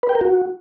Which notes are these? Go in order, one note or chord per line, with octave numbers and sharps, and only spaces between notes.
B4
G5
A#4
F#4